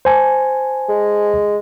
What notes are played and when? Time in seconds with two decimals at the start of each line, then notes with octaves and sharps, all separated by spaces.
0.05 C5 G#5 A5
0.89 G#3